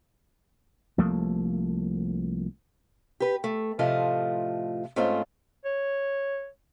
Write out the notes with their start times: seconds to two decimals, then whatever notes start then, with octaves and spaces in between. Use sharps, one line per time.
0.98 C2 F3 A3 A#3
3.20 G4 B4
3.44 A3
3.79 A2 C3 F3 A3 F4 D#5
4.96 G#2 A3 C4 C#4 F4 C5
5.65 C#5